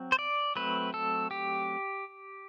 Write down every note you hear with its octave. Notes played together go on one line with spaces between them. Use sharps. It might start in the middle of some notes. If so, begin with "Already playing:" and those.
Already playing: F#3 C4
C5
D5
F#3 A3 C4 B4
A4
G4